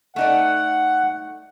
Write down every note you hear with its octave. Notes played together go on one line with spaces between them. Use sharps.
A3 D#4 D5 F#5